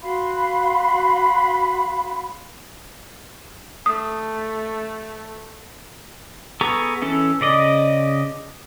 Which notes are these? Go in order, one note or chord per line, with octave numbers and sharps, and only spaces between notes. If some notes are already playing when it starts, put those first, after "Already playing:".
F#4 F5 B5 C6
A3 D#6
B3 G#4 A4 A#5 C#6
E3 C#4 A4
C#3 D5 D#5